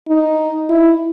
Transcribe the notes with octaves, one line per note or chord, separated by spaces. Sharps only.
D#4
E4